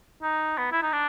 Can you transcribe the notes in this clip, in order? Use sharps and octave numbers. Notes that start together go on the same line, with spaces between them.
D#4
B3
E4
D#4
D4